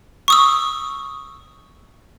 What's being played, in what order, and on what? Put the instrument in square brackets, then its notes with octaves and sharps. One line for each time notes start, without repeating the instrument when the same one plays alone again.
[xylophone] C#6 D#6 E6